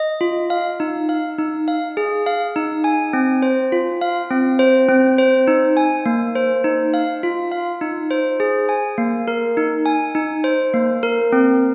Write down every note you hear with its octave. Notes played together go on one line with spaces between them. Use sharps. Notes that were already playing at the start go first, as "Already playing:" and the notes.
Already playing: D#5
F4
F5
D#4
F5
D#4
F5
G#4
F5
D#4
G#5
C4
C5
F4
F5
C4
C5
C4
C5
D#4
G#5
A#3
C5
D#4
F5
F4
F5
D#4
C5
G#4
G#5
A#3
A#4
D#4
G#5
D#4
C5
A#3
A#4
C4